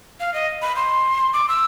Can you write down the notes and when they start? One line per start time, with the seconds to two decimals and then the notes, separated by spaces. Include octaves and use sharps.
0.20 F5
0.34 D#5
0.62 B5
0.76 C6
1.33 D6
1.49 E6